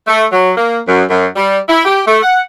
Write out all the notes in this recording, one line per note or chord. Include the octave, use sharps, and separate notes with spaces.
A3
F#3
A#3
F#2
F#2
G3
E4
G4
A3
F#5